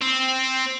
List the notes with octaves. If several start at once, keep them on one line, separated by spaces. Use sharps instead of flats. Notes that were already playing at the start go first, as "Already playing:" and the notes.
C4